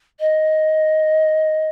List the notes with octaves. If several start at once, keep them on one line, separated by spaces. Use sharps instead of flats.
D#5